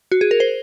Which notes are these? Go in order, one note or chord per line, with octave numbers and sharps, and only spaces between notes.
F#4
G#4
A#4
C5